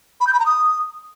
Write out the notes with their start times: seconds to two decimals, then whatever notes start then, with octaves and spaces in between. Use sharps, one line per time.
0.20 B5
0.27 G6
0.33 B5
0.39 A#5
0.46 D#6